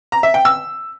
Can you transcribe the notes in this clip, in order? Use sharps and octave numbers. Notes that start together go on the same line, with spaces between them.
A#5
E5
G5
E6